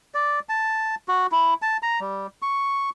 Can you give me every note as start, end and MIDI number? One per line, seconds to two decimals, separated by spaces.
0.14 0.39 74
0.49 0.95 81
1.08 1.27 66
1.32 1.54 64
1.62 1.77 81
1.82 2.00 82
2.00 2.27 55
2.42 2.90 85